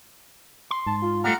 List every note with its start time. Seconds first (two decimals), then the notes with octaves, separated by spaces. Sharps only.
0.71 C6
0.86 G#2 A5
1.02 F4
1.24 G3 A3 A4 F#5 A#5 F6